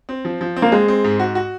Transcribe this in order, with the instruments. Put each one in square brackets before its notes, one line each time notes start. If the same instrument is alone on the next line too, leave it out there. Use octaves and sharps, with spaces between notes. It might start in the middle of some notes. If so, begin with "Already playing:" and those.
[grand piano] C4
F3
F3
C4
[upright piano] A#3
[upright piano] G#3 [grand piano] C4
[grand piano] C4
G#2
F#4
F#4